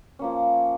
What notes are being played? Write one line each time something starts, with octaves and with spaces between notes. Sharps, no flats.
F3 A#3 C#4